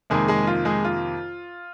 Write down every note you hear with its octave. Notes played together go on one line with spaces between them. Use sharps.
F2 C3 D#3 G#3 A#3 G#4
G#3 G#4
F4
G#3 G#4
F4